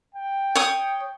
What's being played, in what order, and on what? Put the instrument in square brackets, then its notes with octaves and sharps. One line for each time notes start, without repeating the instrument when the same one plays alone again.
[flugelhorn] G5
[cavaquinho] C#5 D#6